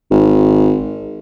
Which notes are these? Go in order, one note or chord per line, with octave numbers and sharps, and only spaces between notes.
G#1